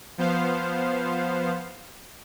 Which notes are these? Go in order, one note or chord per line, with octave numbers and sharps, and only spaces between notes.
F3 B3 C5 F5